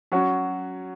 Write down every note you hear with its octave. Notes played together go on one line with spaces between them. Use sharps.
F#3 C#4 F#4